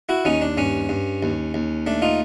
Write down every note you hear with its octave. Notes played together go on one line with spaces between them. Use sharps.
E4 F#4
D#2 C#4 D#4
D4
G2 C#4
G2
D#2
D#2
A3 D4
D#4 F4